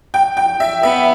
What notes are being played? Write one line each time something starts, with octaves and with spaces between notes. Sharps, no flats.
G5
G5
E5
B3 E5